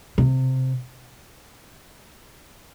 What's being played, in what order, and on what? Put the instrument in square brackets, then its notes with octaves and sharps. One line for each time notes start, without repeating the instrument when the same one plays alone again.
[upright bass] C3